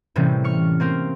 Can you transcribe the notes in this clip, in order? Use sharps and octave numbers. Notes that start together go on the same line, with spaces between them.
A2 C3 E3 G3 A#3 C#4
C#6 F6 C#7
A#3 C4 A#4